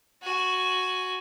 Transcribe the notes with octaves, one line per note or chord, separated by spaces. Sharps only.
F#4 G#5